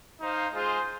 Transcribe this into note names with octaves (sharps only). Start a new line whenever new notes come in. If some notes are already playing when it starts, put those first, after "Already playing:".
D#4 C5 F5
G#3 F4 G#4 C5